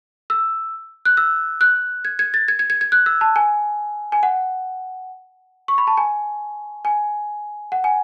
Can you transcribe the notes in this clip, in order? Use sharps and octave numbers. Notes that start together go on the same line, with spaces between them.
E6
F#6
E6
F#6
G#6
G#6
A6
G#6
G#6
G#6
G#6
F#6
E6
A5
G#5
G#5
F#5
C#6
B5
A5
G#5
G#5
F#5
G#5